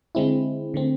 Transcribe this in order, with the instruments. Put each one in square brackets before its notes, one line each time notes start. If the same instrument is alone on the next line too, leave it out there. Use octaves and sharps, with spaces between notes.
[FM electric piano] D3 G#3 C4 E4
D3 A3 C4